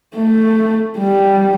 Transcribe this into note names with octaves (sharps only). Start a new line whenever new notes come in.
A3
G3